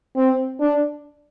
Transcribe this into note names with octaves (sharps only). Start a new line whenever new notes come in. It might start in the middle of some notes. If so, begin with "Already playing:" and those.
C4
D4